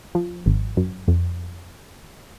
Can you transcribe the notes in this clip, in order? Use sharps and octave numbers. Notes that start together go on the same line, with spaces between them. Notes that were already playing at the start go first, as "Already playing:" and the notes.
F3
G#1
F#2
F2